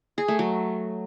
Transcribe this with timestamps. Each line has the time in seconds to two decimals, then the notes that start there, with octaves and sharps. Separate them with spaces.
0.18 G#4
0.28 A3
0.39 F#3